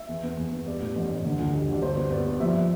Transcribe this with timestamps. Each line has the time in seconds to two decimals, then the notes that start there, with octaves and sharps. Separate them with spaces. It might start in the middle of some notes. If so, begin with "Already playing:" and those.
Already playing: E5
0.08 E2
0.23 B3
0.37 E2
0.52 B3
0.66 G3 D5
0.81 A2
0.96 A1
1.10 A1
1.25 D3
1.39 D2
1.53 G3
1.68 D2 D5
1.82 G2 C5
1.97 B3
2.11 B3 D5
2.26 G3
2.40 F3 E5